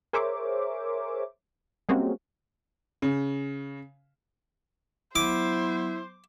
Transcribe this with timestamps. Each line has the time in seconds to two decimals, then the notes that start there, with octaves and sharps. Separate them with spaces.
0.13 G#4 A#4 C5 C#5 E5 D6
1.89 G3 G#3 A#3 C4 C#4 F#4
3.02 C#3
5.16 F#3 B3 E4 C5 D6